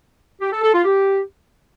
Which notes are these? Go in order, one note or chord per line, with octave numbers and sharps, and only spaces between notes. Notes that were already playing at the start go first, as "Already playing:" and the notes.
G4
A4
A4
F4
G4